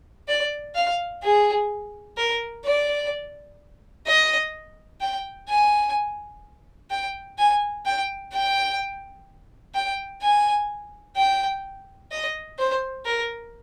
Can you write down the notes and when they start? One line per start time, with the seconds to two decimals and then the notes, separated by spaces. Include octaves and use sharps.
0.28 D5
0.75 F5
1.23 G#4
2.17 A#4
2.65 D5
4.07 D#5
5.01 G5
5.49 G#5
6.90 G5
7.38 G#5
7.85 G5
8.32 G5
9.75 G5
10.22 G#5
11.16 G5
12.11 D#5
12.58 C5
13.05 A#4